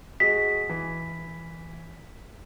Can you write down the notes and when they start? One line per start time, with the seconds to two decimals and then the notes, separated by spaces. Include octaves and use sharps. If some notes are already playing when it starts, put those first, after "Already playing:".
0.20 G#3 F#4 D#5 B6
0.69 E3